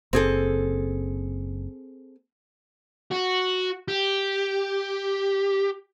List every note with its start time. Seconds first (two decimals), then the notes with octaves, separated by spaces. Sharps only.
0.13 F#1 C4 G#4 A4
3.11 F#4
3.88 G4